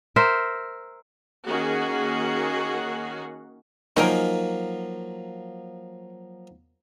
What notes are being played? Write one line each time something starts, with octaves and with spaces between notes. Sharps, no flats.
A#4 C5 E5
D#3 A#3 C#4 F#4 G#4 F#5
F3 F#3 A#3 D#4 G#4 A#4